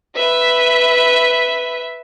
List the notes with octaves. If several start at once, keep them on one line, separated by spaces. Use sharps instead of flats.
B4 E5